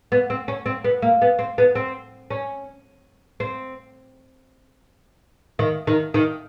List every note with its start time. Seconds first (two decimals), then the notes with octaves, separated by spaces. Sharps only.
0.12 B3
0.30 C4
0.48 C#4
0.66 C4
0.84 B3
1.02 A#3
1.22 B3
1.39 C4
1.58 B3
1.75 C4
2.30 C#4
3.40 C4
5.59 D#3
5.87 D#3
6.14 D#3